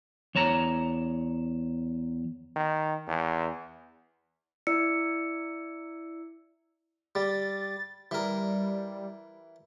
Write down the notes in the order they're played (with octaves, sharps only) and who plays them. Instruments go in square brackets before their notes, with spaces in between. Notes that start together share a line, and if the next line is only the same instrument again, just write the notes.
[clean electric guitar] E2 C#5 A5 A#5
[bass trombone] D#3
E2
[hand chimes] E4 D5 E6 C#7
[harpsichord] G3 [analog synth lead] A6
[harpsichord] E3 A#4 [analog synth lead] G3